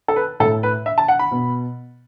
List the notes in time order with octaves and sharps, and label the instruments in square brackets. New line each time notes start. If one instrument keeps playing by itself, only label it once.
[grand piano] A4
B4
A2 A4
A3
B4
E5
A5
F#5
B5
B2 B3